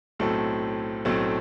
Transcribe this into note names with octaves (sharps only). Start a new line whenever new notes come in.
B1 A2 F#3 A3 C4 A4
B1 A2 F#3 A3 C4